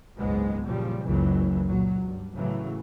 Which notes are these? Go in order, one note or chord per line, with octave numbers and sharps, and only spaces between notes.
F#1 C#2 G#2 G#3 B3
F#1 A#2 C#3 F3 G3
F#1 C#2 F#2 C#3 E3 F#3
C#2 A#2 F#3
G2
A2 C#3 E3 F#3